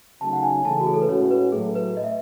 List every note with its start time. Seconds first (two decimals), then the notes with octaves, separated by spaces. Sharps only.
0.21 C#3 F#3 A3 D#4 A5
0.33 F#5
0.43 G#5
0.64 C#3 E3 A3 A5
0.80 F#4
0.87 G#4
0.94 A4
1.02 B4
1.08 A2 G#3 C#4 F#4 C#5
1.31 B4
1.52 A2 F#3 A3 G#4
1.75 B4
1.97 D#5
2.04 E5